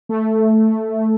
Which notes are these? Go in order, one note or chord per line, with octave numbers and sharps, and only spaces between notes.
A3